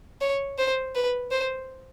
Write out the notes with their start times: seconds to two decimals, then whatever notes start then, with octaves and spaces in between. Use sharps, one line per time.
0.21 C#5
0.58 C5
0.95 B4
1.31 C5